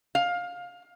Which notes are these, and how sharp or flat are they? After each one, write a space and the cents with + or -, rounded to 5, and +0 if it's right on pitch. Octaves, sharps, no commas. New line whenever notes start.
F5 +20